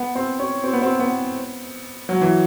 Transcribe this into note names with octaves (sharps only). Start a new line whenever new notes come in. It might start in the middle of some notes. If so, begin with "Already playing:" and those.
Already playing: B3
C4
C#4
C4
B3
C4
B3
F#3
E3